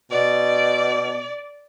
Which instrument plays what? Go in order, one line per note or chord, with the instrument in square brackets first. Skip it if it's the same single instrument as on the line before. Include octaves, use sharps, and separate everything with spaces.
[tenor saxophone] B2 [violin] D5